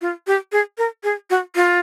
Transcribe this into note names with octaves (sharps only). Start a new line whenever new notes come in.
F4
G4
G#4
A#4
G#4
F#4
F4